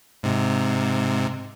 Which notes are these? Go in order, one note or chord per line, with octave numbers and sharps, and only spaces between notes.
G#2 C3